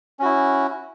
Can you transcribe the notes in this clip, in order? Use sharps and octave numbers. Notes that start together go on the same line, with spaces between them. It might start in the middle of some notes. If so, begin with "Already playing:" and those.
C#4 E4 F#4